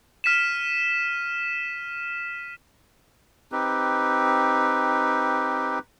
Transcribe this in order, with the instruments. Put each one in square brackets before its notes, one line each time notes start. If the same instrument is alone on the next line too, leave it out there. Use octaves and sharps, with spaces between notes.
[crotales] F6 B6 D#7 E7
[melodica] C4 D#4 G4 B4